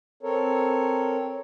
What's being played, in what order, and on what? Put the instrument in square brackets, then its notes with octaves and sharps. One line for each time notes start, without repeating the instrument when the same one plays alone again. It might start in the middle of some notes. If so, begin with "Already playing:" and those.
[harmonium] C4 A4 A#4 C#5